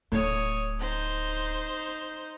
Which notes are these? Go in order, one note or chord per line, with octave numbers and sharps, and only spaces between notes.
D1 A2 C#5 D#6
D#4 C5